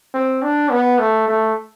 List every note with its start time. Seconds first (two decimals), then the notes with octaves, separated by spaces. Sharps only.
0.14 C4
0.42 D4
0.70 B3
0.99 A3
1.28 A3